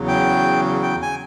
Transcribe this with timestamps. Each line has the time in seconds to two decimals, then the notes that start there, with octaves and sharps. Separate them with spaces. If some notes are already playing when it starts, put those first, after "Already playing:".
Already playing: E2 C#3 F#3
0.08 G5
0.83 G5
1.02 G#5